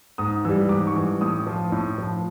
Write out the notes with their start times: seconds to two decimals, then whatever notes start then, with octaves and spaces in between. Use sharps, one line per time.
0.18 G#2 D#6
0.45 E3 G3 E6
0.69 G#2 D6
0.87 C#6
0.95 E3 G3
1.03 D6
1.21 A2 D#6
1.47 F3
1.72 A2
1.98 F3